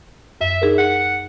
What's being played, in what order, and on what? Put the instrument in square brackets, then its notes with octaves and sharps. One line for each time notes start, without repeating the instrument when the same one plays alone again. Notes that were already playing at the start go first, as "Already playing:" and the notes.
[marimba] F#2 [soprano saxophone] E5
[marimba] D#4 G#4 A#4
[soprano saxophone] F#5 [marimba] F#6